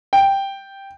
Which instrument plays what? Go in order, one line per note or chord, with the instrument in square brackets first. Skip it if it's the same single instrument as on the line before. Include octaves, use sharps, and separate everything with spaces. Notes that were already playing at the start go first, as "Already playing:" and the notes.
[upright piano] G5